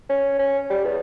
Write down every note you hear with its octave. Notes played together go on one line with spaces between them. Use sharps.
C#4
C#4
G3
E2